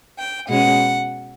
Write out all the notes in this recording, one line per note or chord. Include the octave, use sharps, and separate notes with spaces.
G5
B2 G#3 C#4 F#5